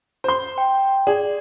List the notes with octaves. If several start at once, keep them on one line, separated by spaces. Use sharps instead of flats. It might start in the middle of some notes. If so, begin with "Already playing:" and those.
C5 C6
G5
G#4 D5